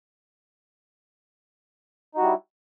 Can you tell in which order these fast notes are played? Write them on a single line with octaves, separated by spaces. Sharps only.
D#4 F#4 G3 E4